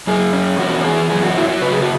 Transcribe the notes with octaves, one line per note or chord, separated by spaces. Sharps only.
F#2 G#4
C#4
E2 F#4
E3 G#4
F#2 G#4
F#4
F#3 E4
F#4
C#3 B4
G#4
F#4